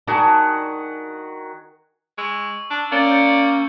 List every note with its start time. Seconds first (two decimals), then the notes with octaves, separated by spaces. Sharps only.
0.07 D#3 D4 F#4 G#4
2.18 G#3 C#6 E6
2.71 D4
2.92 A#3 C#4 D5 C#7 E7 G7
3.11 G6 A6 C#7